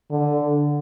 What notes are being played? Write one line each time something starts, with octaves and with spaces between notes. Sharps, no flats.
D3